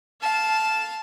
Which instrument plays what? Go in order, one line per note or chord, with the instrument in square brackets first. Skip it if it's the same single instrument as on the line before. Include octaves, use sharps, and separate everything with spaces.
[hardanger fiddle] F5 A5